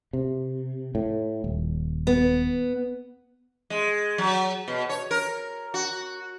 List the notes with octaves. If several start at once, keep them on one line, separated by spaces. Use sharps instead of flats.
C3
A2
D#1
B3
G#3
F#3
B2
C#5
A#4
F#4